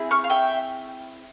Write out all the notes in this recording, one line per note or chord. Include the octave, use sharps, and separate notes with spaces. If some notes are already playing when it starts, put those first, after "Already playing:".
Already playing: C4 E4 G#4
C#6 F6
F5
E5 G5